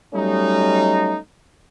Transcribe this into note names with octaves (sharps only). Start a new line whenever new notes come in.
F#3 G3 A3 C#4 D#4